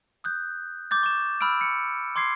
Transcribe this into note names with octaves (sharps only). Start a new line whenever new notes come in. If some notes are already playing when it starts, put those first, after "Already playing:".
D#6 F#6 G6
D6 G6 A6
C#6 E7
B5 E6 F6 D7
C#7
C6 D6 G#6 C7